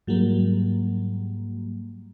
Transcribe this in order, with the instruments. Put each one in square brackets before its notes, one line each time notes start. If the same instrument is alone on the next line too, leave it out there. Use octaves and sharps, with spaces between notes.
[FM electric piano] G#2 F#3 G3 A#3